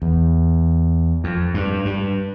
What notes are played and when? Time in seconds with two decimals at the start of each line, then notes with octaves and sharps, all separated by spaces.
0.02 E2
1.24 F2
1.54 G2
1.85 G2